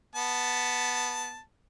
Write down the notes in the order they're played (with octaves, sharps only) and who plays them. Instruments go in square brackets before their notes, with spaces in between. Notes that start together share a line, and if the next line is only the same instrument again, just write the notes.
[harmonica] B3 A5